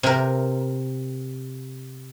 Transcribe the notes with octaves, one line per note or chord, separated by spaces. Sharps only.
C3 A#4